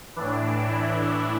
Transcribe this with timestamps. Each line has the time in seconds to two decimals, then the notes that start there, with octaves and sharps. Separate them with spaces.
0.16 A2 E3 D4
0.68 E4